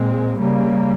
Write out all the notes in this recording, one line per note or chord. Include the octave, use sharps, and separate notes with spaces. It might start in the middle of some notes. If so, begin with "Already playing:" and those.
Already playing: A#2 G#3 C4
C#3 G3 A#3